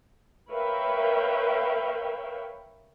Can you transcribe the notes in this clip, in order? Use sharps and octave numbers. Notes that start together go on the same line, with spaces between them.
A#4 B4 C#5 E5 F5 G5